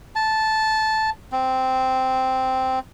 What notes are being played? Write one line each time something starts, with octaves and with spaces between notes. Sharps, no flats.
A5
C4